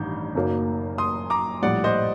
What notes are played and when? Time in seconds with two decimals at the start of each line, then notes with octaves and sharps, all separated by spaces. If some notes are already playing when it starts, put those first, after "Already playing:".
Already playing: A1 G2 D#3 A#5 G6
0.35 F#1 F#2 F#3 A#3 D#4
0.98 C6 D#6
1.30 A#5 D6
1.62 A#1 A2 G3 D5 F#5
1.84 C5 D#5